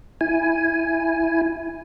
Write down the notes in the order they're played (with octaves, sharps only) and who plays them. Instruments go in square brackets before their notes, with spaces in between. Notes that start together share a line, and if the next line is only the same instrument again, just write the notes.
[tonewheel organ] E4 G#5